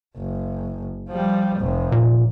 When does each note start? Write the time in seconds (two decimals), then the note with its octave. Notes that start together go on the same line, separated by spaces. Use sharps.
0.17 F#1
1.09 F3 G3
1.59 F1 F2
1.92 A#2